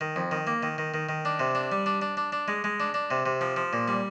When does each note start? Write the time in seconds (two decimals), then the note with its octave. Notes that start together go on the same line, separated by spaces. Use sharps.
0.01 D#3
0.16 F2
0.31 D#3
0.47 A#3
0.63 D#3
0.78 D#3
0.94 D#3
1.09 D#3
1.25 D4
1.39 C3
1.55 D4
1.72 G3
1.86 D4
2.02 D4
2.17 D4
2.32 D4
2.48 G#3
2.64 G#3
2.80 D4
2.94 D4
3.11 C3
3.26 C3
3.41 F3
3.56 F3
3.73 A#2
3.88 G3